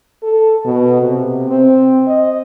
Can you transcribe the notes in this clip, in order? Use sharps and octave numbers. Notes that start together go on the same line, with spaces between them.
A4
B2
C3
C4
D#5